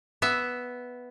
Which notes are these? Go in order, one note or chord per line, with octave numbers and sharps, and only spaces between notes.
B3 E5